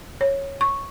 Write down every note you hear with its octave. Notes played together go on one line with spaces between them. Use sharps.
C#5
C#6